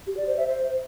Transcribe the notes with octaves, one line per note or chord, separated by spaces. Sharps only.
G4
D5
C5
E5
C5